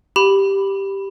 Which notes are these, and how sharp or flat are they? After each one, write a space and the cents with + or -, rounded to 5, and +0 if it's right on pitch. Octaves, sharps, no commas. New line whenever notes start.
G4 +0 B5 +0